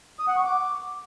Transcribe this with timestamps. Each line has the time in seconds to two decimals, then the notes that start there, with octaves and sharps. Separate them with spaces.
0.19 D#6
0.28 F#5
0.36 C#6
0.45 D6